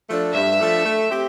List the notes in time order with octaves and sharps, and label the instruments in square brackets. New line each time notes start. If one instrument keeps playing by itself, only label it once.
[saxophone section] F3 A3 D4 A4
[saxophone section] G2 [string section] E5
[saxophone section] F3 A3 D4 A4
A3
C4 G4